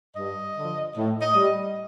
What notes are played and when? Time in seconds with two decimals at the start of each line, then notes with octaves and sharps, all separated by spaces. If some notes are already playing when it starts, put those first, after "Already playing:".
0.16 G2 D#5
0.56 D3 F3
0.96 A2
1.22 D#5
1.35 G3